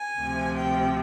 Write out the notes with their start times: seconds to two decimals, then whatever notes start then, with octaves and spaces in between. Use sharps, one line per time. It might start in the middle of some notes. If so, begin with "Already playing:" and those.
Already playing: G#5
0.19 D2 C3 F3
0.56 G5